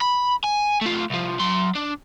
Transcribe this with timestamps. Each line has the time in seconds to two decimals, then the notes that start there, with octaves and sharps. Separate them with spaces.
0.01 B5
0.44 G#5
0.81 A3 F4
1.10 C2 F3
1.39 F#3 C6
1.75 D4